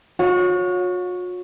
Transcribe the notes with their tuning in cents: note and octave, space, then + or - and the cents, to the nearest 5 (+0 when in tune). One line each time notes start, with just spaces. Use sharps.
F#4 -45 C#5 +0 F#5 -45